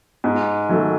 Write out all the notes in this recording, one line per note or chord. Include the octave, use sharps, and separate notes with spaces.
G#2
D#3 F#3 A3